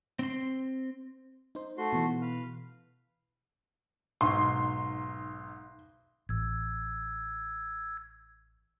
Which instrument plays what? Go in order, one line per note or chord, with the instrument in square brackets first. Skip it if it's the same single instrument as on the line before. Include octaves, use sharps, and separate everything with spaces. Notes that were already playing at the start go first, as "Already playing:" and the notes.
[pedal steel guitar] C4 C6
[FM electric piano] D#4 C5
[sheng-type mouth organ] A3 F#4 C6
[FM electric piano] B2 E3
[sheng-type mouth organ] B4 F5
[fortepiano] B1 G#2 C#6 [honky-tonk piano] C6
[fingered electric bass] A1 [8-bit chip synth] E6 G#6